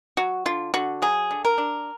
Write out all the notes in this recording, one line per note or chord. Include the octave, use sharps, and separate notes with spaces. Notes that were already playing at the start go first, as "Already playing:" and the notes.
F#3 F#4
D3 F4
D3 F#4
F#3 G#4
D3
A#4
D4